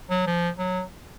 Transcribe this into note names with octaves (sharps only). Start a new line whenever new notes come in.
F#3
F3
F#3